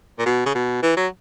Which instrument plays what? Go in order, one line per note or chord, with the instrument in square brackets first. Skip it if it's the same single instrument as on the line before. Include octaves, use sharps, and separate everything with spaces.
[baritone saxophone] A#2
B2
C#3
B2
E3
F#3